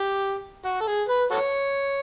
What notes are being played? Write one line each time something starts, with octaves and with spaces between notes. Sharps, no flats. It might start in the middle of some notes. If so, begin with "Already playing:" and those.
Already playing: G4
F#4
A4
G#4
B4
F#4 A4 C#5